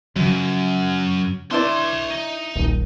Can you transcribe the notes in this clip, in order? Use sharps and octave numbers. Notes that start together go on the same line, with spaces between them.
F#2 C#3 F3 F#3
D4 E4 C#5 D5 C6
D#4
D#1 A#1